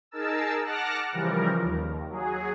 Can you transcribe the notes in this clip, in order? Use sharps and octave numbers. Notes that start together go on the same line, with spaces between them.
D#4 G#4 A#4 A5 E6
F#5 A5 D6 F6 F#6 A#6
C#3 E3 F3 G3 A#4
D#2
F#3 G#4